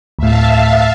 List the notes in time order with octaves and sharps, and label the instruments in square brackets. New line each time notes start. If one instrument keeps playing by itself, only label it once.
[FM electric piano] D2 A2 [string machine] E5 F5 A5